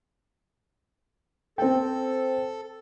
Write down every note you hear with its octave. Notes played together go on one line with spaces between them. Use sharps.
C4 A4 G5